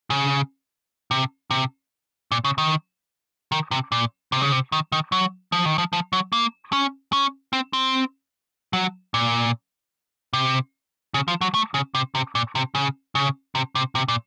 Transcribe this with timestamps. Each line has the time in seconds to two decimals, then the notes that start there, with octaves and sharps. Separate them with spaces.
0.10 C#3
1.11 C3
1.51 C3
2.32 A#2
2.44 C#3
2.58 D#3
3.52 D#3
3.71 C3
3.92 A#2
4.32 C3
4.42 C#3
4.52 C3
4.72 D#3
4.92 D#3
5.12 F#3
5.52 F3
5.65 D#3
5.78 F3
5.93 F3
6.13 F#3
6.32 A#3
6.73 C#4
7.13 C#4
7.53 C4
7.73 C4
8.73 F#3
9.14 A#2
10.33 C3
11.14 C#3
11.28 F3
11.41 F#3
11.54 A3
11.74 C#3
11.95 C3
12.15 C3
12.35 A#2
12.55 C3
12.75 C#3
13.15 C#3
13.55 C3
13.75 C3
13.95 C3
14.08 A#2